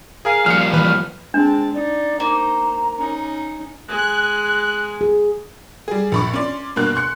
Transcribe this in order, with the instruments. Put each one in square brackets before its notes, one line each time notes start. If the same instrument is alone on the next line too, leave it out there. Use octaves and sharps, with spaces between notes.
[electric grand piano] G#4 A#4 G#5 [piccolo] F5
[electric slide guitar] F3 G3 A#3 [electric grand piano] F6 C#7
[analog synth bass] E3 [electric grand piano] B4 [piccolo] F6
[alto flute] G#3 [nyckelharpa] C4 A5 [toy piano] D4
[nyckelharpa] D#4 [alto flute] D5
[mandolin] A#3 [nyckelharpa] D#4 C5 [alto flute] A#5
[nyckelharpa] C#4 D#4
[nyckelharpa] G#3 G#5 [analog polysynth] F#6
[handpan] G#4
[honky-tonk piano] G3 G#4
A#1 B5 C#6
C#4 D5 C6
G2 B2 A#3 F#6
C6 C#6 F#6 C#7